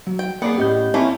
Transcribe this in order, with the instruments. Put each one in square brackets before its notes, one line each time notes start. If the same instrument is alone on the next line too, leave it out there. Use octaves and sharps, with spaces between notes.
[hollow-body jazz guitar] F#3
[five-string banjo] G5
[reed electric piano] A#3 [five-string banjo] B3 [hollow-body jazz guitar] G#4 D5 F#5
[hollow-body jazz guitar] A2 C#4 [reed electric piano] G4 D#5 G6
[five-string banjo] A3 A#3 C#4 [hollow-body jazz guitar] C4 E4 C#5